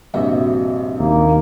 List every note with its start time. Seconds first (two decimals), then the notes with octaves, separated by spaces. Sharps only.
0.14 A#1 G2 C3 F#4 D#5 E5
1.00 D#2 A#3